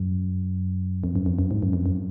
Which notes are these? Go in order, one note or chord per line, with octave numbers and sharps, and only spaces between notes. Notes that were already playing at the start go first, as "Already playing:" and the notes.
Already playing: F#2
F2
F#2
F2
F#2
G#2
F#2
F2
F#2